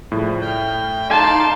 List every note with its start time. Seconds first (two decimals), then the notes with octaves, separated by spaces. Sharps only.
0.12 A2 C#3 F3 G3
0.42 G5 F6
1.10 D#4 D5 F5 A5 C6